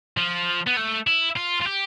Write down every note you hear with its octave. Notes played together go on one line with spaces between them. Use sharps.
F3
B3
A3
E4
F4
F4
G4